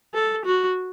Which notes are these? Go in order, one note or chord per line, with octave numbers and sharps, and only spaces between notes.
A4
F#4